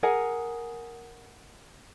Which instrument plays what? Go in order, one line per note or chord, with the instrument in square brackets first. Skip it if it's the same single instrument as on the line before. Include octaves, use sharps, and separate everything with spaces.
[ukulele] G#4 A#4 F#5 G#5